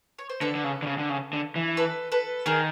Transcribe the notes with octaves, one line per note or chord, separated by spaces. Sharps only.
C#5
C5
D3 A4 B4
D3
C#3
D3
C#3
D3
C#3
D3
E3
A4 B4
A4 B4
D#3 G#4 A#4